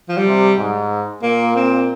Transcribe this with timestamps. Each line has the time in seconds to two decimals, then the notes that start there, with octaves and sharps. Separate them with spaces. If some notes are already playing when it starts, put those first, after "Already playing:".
0.09 F3
0.17 G3
0.26 C3
0.57 G#2
1.23 A#2 A#3
1.56 C4